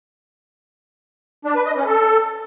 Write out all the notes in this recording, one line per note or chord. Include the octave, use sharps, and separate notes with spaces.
D4
B4
D#5
C#4
A4